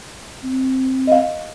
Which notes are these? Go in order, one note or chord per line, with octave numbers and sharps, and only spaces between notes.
C4
D#5 F5